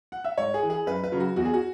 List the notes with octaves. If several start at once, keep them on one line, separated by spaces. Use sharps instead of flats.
F#5
E5
G#2 C#5
G#4
E3
G#4
F#2 B4
B4
C#3 F#3
F#4
E2 F#4
G#4
F#4